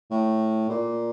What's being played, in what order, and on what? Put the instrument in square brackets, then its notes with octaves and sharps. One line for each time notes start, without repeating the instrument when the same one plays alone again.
[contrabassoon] A2
A#2